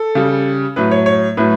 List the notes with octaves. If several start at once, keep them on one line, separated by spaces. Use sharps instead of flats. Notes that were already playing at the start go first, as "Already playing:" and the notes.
Already playing: A4
C#3 G3
A2 F#3 B4
C#5
C#5
A2 F#3 B4